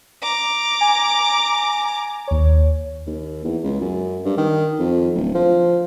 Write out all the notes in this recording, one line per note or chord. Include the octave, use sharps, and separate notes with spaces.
A#5 D6
G#5
D#2 C#5
D#2
E2
C#2
F#2
G2
D#3
F2
D1
F3